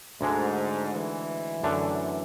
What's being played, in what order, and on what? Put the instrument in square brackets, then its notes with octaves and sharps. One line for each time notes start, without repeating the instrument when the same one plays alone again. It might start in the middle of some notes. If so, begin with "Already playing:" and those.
[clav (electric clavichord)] D2 D3 G#3 [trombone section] G#2
[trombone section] E3
[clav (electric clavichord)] F#2 D3 A3 D4